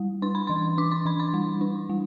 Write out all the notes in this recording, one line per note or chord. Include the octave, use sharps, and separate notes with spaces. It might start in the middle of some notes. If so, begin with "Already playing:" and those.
Already playing: G3
D4 C6
B5
E3 C6
D4 D6
C6
E3 B5
C6
G3
D4
G3